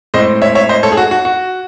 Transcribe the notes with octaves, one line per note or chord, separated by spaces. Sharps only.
A2 G#3 C4 C5 D#5
C#5 E5
C#5 E5
C5 D#5
A4 C#5
G#4
F#4
F#4
F#4